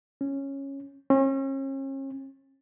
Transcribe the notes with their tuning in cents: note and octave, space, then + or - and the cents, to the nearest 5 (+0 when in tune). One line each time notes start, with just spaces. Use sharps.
C#4 -10
C#4 -40